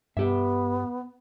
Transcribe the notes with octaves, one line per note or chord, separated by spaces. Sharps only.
G2 B3 G4 E5